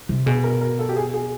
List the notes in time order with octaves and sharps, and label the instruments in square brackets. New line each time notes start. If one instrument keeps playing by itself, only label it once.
[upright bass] C3
[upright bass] B2 [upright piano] G#4
[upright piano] A#4
A#4
A4
G4
G#4
G#4